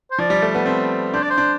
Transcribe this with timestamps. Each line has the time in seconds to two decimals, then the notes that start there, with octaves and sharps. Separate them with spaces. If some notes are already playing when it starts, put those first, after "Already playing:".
0.11 C5
0.18 F3 D5
0.30 G3
0.42 A3
0.55 B3
0.66 C4
1.14 D4 C5
1.22 D5
1.30 C5
1.38 D4